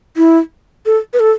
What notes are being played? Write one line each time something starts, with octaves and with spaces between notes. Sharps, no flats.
E4
A4
B4
A4